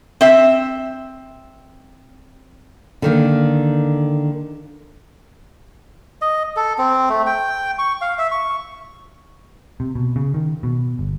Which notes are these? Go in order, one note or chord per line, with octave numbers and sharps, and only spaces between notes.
C4 E5
D3 D#3 A#3
D#5
A4
C4
A3
G5
C#6
F5
E5
C#6
C3
B2
C#3
D#3
B2
G1